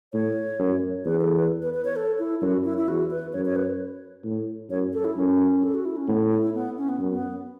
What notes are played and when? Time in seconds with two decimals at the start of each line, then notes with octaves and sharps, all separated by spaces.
0.13 A2 C#5
0.59 F#2
1.05 E2 B4
1.21 A4
1.36 B4
1.62 B4
1.74 B4
1.85 C#5
1.96 A4
2.19 E4
2.42 F#2 F#4
2.64 E4
2.77 E4
2.88 E2 F#4
3.11 B4
3.33 F#2 C#5
3.45 C#5
3.56 B4
4.25 A2
4.70 F#2 C#5
4.93 A4
5.05 E4
5.16 F#2 C#4
5.63 A4
5.74 F#4
5.85 E4
5.97 C#4
6.08 A2 B3
6.31 E4
6.42 E4
6.54 B3
6.77 C#4
6.89 B3
7.00 F#2
7.11 B3